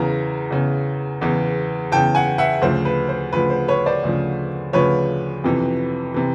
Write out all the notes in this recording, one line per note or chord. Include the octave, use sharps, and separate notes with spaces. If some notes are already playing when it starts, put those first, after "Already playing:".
Already playing: E2 C#3 E3 A#5
E2 C#3 E3
E2 C#3 E3
E2 C#3 E3 G5 A5
F#5 G#5
E5 F#5
D2 C#3 F3 C5
B4
C5
D2 C#3 F3 B4
C5
B4 C#5
C5 D5
D2 C#3 F3
D2 C#3 F3 B4 C#5
F2 C3 E3
C3 E3